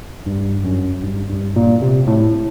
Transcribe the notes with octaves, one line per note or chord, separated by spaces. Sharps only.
G2
F#2
G2
G2
A#2
C3
A2